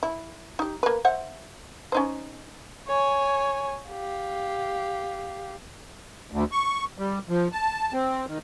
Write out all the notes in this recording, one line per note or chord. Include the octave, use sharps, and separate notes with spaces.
E4
D#4 G4
A#3 B4
C5 E5 F#5
C#4 D#4 C5
C#5 G#5
G4 F5
D2
C#6
G3
F3
A5
C4
D#3